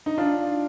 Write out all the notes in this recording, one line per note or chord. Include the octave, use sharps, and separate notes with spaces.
D#4
D4 F4